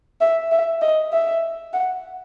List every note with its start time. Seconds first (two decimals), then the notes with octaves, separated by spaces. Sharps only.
0.21 E5
0.52 E5
0.82 D#5
1.13 E5
1.74 F#5